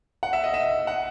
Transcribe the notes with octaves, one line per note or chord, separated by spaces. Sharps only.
F#5
E5
D#5
E5
F#5